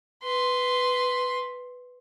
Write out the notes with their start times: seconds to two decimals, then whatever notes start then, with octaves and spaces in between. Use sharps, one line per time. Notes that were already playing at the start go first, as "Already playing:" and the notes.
0.24 B4 C6